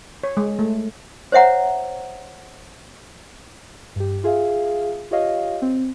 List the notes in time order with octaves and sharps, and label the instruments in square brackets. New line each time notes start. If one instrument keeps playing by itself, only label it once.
[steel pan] C#5
G#3
A3
[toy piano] C5 C#5 E5 F#5 A#5
[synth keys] G2 G4
F4 G#4 E5 F5
F4 G4 C#5 D#5 F5
C4